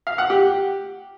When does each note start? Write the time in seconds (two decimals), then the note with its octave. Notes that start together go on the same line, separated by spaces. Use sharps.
0.07 F5
0.18 F#5
0.30 G4